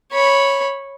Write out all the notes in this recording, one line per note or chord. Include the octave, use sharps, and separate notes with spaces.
C#5 B5